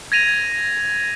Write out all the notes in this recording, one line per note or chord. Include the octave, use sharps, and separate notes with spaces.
G#6 A#6 D#7 F7